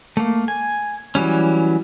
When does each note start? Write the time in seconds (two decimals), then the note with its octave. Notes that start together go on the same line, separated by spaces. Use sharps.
0.17 A3 A#3
0.48 G#5
1.15 E3 F#3 G3 C#4